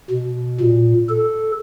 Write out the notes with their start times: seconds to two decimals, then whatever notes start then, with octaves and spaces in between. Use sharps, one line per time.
0.11 B2
0.61 A#2
1.09 A4